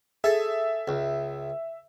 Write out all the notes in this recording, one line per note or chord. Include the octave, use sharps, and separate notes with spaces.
G#4 A4 E5
C#2